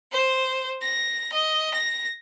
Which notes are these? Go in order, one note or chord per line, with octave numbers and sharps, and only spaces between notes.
C5
A#6
D#5
A#6